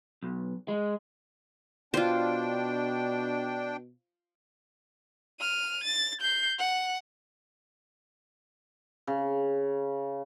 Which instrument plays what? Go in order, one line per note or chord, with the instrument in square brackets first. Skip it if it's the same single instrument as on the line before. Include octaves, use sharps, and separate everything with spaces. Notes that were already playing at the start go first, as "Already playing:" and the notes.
[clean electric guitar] B1
G#3
[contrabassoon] B2 [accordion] D4 G5 [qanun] F4 C5
[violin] F6 D#7
A6
G6 C7
F#5
[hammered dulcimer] C#3